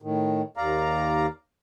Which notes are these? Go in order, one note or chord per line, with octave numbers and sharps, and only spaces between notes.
A2 D#3
D#2 D5 F5 A#5